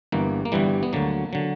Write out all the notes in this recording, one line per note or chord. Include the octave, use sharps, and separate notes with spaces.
G1 G2 E3 A#3
A#3
G1 G2 E3 G3
B3
D2 D3 F#3 A#3
D3 F#3